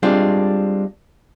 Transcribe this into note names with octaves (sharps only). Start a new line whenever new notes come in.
G3 G#3 C4 D4 F4